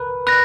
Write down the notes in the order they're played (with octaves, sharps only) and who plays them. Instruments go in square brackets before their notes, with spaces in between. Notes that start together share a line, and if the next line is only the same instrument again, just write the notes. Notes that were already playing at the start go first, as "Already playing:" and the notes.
Already playing: [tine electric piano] A#4 B4
[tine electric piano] B4 [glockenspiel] F#6 A#6